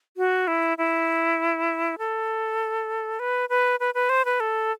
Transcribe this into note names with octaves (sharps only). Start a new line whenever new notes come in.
F#4
E4
E4
A4
B4
B4
B4
B4
C5
B4
A4